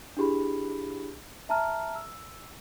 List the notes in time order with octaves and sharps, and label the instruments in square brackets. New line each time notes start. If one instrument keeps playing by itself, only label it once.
[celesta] D4 E4 G4 G#4 B5
E5 A5 A#5 F6
E6